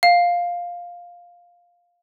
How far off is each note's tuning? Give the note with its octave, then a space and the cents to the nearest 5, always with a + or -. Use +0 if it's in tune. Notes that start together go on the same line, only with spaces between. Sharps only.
F5 +5